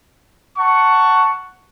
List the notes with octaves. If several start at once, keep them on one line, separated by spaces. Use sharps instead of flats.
F#5 A5 C#6